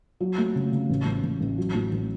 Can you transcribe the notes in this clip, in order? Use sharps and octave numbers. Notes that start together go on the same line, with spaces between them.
F#3
A3
C#3
C#3
A1
A1
A1
A1
F#3
A2
A1